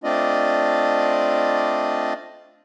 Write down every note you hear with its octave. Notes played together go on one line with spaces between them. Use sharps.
A3 C4 D4 F4 D5 D#5